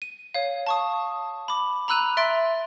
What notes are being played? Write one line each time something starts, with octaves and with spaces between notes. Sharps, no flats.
D#7
C#5 F5
A5 C#6 D#6
B5 D6
A#5 B5 E6 F#6 D#7 F7
E5 C6 A6 D7